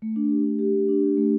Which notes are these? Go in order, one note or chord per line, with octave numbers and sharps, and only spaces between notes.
A3
D4
G4
D4
G4
A3
D4
G4
A3